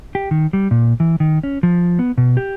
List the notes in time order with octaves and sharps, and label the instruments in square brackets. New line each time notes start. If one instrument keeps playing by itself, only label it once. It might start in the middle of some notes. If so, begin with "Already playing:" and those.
[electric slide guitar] G4
D#3
G3
A#2
E3
D#3
C#4
F3
B3
B2
G4